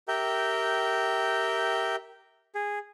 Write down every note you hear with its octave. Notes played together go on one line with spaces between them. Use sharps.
G4 A#4 E5 G5
G#4